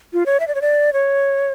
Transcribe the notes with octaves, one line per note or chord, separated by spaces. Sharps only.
F4
C#5
E5
D5
C#5
D5
C#5